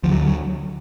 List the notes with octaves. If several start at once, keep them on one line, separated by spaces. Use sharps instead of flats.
D2 D3 F3
F#3
F#3